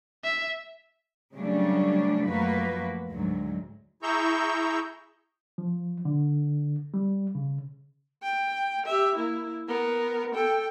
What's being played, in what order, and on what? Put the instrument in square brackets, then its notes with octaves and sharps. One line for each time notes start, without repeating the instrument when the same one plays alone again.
[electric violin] E5
[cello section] C#3 F#3 G3 A3 C#4 D4
F#2 F3 A3 A#3 F#4 B4
D2 G#2 F#3
[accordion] E4 G#4 A#5 C#6 E6 G6
[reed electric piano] F3
D3
G3
C#3
[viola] G5
G4 E5
A#3 E4
B3 A#4
A4 G5